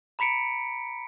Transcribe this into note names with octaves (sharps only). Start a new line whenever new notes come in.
A#5 B5 B6 C#7 D7